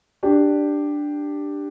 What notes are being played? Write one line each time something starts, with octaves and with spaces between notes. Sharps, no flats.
D4 G4